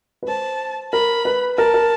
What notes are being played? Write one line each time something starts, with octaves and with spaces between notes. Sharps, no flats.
B4
C5 A5
A#4 B5
B4
A#4 A5
A#4